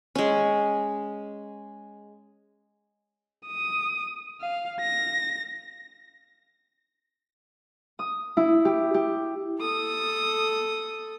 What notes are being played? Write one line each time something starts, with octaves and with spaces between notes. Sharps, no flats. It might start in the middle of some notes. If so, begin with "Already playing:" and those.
G#3 C#4
D#6
F5
A#6
D#6
E4
G4
G4
A4 D#6